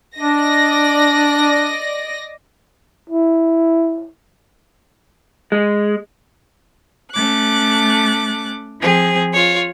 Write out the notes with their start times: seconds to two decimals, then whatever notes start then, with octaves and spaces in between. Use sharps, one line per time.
0.18 D4 D5 D#5 A#6
3.10 E4
5.52 G#3
7.13 A3 C#4 D6 F#6
8.81 F3 C4 G#4
9.34 F4 C#5